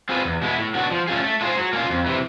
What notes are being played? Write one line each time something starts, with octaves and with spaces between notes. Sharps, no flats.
C4 F4 G#4 B4
E2
B2 G#3 B3 E4
A2
F#3 B3 D4 F#4
F3
A3 C#4 F4 G#4
A3
D4 F4 G#4 C5
F#3
A#3 C#4 F4
F2
C3 E3